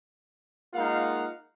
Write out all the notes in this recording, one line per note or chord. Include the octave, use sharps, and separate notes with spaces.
G#3 A#3 D#4 F4 F5 F#5